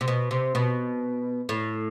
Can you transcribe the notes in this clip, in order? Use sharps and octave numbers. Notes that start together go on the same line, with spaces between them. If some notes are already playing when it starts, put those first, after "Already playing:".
C3
B2
C3
B2
A2